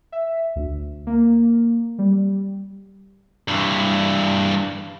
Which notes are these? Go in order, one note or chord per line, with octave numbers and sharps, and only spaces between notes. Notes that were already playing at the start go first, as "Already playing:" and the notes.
E5
D2
A#3
G3
G2 E3